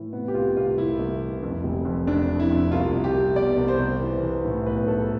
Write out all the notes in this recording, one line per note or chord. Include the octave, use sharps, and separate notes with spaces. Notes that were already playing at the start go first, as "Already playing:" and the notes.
Already playing: A2 E3
C3 B3
G4
C2 F4
C2 F4
C2 E4
C2
E3
F2
F1
F2
F2 D4
F2
E4
F2
C2 F4
C2
G4
C2
B2 D5
C2
C5
C2
E3
E3
A2
B1 B4
A2 A4